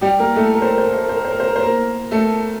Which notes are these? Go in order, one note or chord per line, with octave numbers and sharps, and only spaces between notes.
G3 G4
A#3 A#4
A3 A4
A#4
C5
A#4
C5
A#4
C5
A#4
C5
A#4
C5
A#4
C5
A#4
C5
A#3 A#4
A3 A4